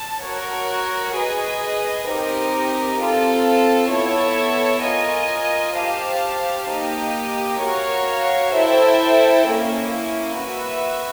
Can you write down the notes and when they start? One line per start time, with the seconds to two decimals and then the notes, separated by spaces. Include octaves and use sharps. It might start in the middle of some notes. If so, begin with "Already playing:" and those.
Already playing: A5
0.24 F#4 A#4 C#5
1.17 G#4 B4 D#5
2.09 C4 D#4 G4 A#4
3.01 C4 F4 A4
3.93 B3 E4 A4 C#5 E5
4.86 F4 A#4 D#5 G#5
5.78 G4 C5 F5 A5
6.70 A#3 D#4 G4
7.63 F#4 A#4 C#5 F5
8.55 E4 A4 C5 E5 G5
9.47 A#3 C#4 E4
10.39 F#4 B4 E5